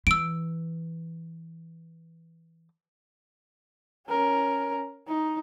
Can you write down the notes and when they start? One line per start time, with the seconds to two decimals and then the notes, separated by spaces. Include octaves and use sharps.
0.07 E3 E6 D7
4.08 C#4 A#4
5.08 D#4